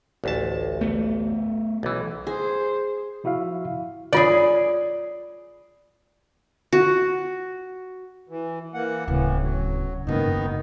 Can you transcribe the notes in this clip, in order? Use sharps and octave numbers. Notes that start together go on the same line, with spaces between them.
A1 D2 A5
A3 B3
B1 E3
G#4 C5
F3 E4 F#4 E5 F5
F4 G#4 C#5 D5
F#4
E3
E3 A#3 F#5
D1 A2 C#3 E3
F#3
F#1 G#2 D#3 B3 D#4